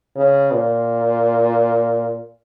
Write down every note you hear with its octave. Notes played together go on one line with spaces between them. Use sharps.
C#3
A#2